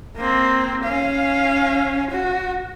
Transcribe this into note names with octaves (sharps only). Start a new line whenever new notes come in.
A#3 C4
C#4 F5
F#4